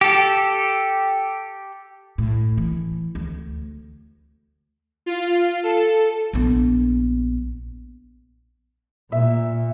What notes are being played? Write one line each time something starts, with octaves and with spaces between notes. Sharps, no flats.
G4 A4
A2
E3
D2
F4
A4
A#1 B3
A#2 E5